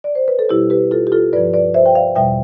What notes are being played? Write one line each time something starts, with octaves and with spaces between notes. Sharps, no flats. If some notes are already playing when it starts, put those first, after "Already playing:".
D5
C5
B4
A4
B2 G3 E4 G4
G4 B4
F4 A4
G4
F4 A4
G2 F3 B4 D5
B4 D5
C5 E5
G5
D5 F5
E2 B2 G3 E5 G5